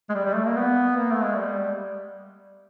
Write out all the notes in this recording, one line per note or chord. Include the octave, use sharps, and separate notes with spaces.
G#3
G3
G3
A3
A#3
B3
A#3
A3
G#3
G3